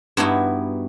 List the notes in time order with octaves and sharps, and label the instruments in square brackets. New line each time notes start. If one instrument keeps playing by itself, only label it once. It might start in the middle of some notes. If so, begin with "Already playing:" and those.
[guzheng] G2 B3 D#4 E4 F#4